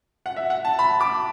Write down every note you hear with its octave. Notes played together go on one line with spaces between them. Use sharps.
F#5
E5
F#5
A5
B5
D6